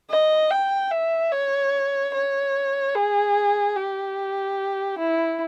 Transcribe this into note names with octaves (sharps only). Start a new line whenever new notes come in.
D#5
G5
E5
C#5
C#5
G#4
G4
E4